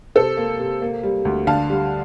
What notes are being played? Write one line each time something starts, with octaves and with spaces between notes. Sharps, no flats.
C3 A4 C5
A#3
C3
A#3
G3
D2
D3 F5 A5
G3